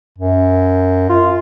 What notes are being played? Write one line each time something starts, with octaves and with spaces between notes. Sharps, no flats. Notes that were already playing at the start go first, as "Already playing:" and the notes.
F#2
F4